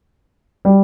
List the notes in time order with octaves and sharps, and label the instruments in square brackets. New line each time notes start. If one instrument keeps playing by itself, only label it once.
[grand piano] G3